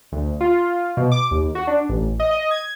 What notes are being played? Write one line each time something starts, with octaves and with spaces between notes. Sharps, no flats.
D2
F4
B2
D6
D#2
F#4
D4
A1
D#5
D#5
G#6